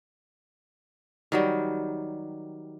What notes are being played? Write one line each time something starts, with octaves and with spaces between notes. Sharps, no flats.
D#3 F#3 G3